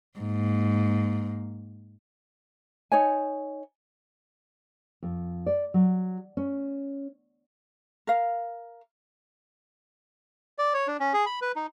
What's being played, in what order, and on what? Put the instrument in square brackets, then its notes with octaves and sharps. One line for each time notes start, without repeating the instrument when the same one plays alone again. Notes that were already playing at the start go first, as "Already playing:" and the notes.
[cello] G#2 A#3
[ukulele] D#4 C#5 G#5
[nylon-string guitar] F2
D5
F#3
C#4
[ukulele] A#4 F5
[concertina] D5
C#5
D4
C#4
G#4
B5
B4
D#4